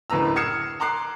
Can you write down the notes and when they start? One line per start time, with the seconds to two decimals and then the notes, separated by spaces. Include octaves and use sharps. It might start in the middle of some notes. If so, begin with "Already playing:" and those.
0.10 F#1 D2 A2 B4 A#5 E6
0.36 D#6 F6 G#6 C7 C#7 E7
0.80 A#5 C6 D6 F#6 C7